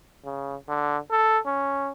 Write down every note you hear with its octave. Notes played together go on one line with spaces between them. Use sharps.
C#3
D3
A4
C#4